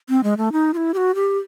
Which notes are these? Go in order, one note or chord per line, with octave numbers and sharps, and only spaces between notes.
C4
G#3
A3
D#4
F4
E4
G4
F#4
G4